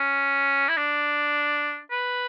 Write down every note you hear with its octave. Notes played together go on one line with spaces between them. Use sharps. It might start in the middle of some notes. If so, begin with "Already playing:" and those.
Already playing: C#4
E4
D4
B4